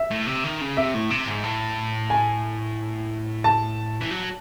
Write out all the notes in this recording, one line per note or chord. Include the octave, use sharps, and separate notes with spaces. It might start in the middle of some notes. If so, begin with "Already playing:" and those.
Already playing: E5
A2
C3
D#3
C#3
C3 E5
A2
C3
G#2
A2
G#5
A5
E3
F#3